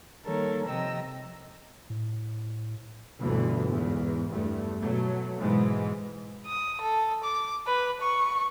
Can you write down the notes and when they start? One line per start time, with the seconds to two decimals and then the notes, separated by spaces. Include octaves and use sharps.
0.25 D#3 G3 A#3 A4 A#4 C#5
0.66 C3 F3 D#5 G5 A#5 E6
1.90 A2
3.20 G1 D2 B2 D3 E3
3.68 E2 G#2
4.30 E2 G2 A3
4.80 B2 F#3 A3
5.40 G#2 B2 E3 G#3
6.46 D#6
6.81 A4
7.24 D6
7.67 B4
8.02 C#6